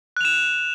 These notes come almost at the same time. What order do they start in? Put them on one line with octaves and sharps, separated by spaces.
F#6 F7 E7